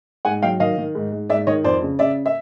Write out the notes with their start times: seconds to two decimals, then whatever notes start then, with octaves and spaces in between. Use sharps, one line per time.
0.25 G#2 F#5 G#5
0.42 F#3 F5 G5
0.60 D#3 D#5 F5
0.78 D#3
0.95 G#2
1.12 G#2
1.29 G#2 D5 E5
1.47 D#3 C#5 D#5
1.64 F2 C5 D5
1.82 C#3
1.99 C#3 D5 E5
2.26 E5